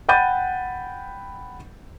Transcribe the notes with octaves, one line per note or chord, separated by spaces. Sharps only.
F#5 G5 B5 G6 A6 D#7